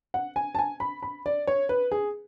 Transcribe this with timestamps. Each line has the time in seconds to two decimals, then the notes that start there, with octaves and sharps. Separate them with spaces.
0.14 F#5
0.36 G#5
0.55 A5
0.59 G#5
0.80 B5
1.03 B5
1.26 D5
1.47 C#5
1.69 B4
1.92 G#4